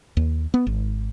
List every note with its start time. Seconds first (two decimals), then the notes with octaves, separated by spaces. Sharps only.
0.17 D#2
0.54 B3
0.67 G#1